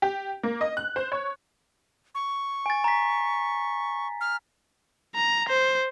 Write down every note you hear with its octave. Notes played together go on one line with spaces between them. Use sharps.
G4
A#3
D#5
F#6
C5
C#5
C#6
G#5 A6
A#5 B6
F6
A#5
C5